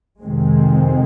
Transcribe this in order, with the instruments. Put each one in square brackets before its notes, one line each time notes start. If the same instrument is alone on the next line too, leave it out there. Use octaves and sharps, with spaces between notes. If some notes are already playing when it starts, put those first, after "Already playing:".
[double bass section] F2 C3 D#3 G#3 C4